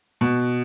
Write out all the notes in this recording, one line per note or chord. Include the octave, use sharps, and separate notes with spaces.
B2